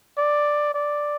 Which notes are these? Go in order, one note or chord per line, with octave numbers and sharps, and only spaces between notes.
D5
D5